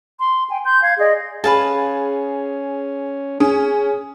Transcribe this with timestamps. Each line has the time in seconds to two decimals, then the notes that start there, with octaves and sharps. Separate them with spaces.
0.19 C6
0.48 G5 G#5
0.64 C6 G6
0.81 F5 G#6
0.99 G#4 D5 D#5
1.44 C#4 G#4 B4 F5 A5
3.40 C#4 G#4